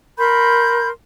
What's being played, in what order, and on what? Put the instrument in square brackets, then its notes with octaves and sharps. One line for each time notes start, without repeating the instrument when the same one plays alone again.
[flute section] A#4 B5 C6 G6